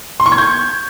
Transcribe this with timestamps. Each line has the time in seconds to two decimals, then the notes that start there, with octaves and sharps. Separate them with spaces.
0.20 C6
0.26 C#6
0.32 G#6
0.38 G6